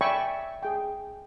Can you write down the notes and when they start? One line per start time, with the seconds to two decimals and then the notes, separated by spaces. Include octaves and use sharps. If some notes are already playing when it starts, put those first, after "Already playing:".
0.01 D5 E5 G5 G#5 B5 C#6
0.63 G#4 G5